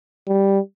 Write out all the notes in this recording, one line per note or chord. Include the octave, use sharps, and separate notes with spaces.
G3